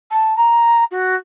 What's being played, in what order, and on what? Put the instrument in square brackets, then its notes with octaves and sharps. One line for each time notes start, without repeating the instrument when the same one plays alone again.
[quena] A5
A#5
F#4